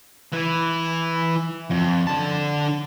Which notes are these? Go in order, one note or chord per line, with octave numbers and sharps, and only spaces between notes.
E3 E4
F2
D3 A5